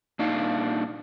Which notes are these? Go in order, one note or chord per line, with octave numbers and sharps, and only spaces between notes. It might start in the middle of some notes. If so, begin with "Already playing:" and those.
A#2 D4 D#4 F5